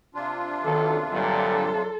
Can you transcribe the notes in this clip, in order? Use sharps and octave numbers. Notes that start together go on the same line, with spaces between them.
C3 D4 F4
B1 D#3 A4
G2 A#2 D3 F#3 A4